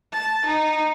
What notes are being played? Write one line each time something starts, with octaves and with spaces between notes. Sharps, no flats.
A5
D#4